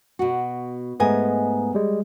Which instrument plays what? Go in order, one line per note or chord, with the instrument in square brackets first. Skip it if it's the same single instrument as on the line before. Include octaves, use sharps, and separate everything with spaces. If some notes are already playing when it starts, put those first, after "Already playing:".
[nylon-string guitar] B2 F#4
[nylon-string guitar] G#2 D#5 G#5 [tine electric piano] G#3 A3 B3
[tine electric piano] G3 G#3